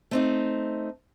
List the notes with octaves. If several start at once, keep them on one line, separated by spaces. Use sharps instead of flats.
A3 C4 D#4